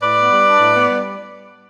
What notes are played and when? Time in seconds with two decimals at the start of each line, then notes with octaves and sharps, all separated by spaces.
0.01 A2 B4 D5
0.15 B3
0.31 G3
0.45 D4
0.60 A2
0.74 B3
0.89 G3